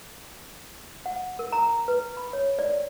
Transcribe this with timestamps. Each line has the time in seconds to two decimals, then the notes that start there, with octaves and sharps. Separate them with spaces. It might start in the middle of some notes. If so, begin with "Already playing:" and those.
1.06 F#5
1.39 A#4
1.52 A#5
1.88 B4
2.17 B5
2.33 C#5
2.59 D5